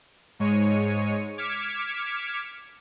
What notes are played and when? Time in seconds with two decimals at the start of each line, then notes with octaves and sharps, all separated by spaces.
0.39 G#2 G#3 C#5 C#7 D#7
1.37 D6 F6 G#6 B6 C#7 E7